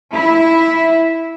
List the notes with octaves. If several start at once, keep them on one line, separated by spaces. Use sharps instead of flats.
E4